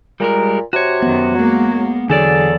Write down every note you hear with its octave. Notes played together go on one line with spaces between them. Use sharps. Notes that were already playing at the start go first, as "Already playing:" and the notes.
A#2 G3 G#3 A#4
C3 F#4 C#5
F#2 D#3 B3
F#3 G#3 A#3
E2 D3 F#3 G#4 A4 D5